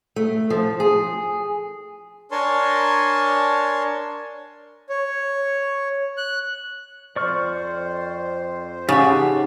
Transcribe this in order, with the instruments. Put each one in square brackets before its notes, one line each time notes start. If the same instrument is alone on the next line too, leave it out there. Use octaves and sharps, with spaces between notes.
[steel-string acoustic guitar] A3
F3
G#4
[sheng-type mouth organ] D4 A#4 C#5 G#5 A5 C6
C#5
F#6
[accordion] F2 C5 [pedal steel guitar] D5 C#6 F6
[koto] C#3 [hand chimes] D#4 F#5 [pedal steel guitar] G4